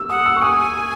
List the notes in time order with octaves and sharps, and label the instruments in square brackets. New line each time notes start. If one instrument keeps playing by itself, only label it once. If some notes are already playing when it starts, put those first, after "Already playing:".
Already playing: [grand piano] E6
[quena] F#5 [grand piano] D#6
[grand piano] E6
C#6
[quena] G#5 [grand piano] D#6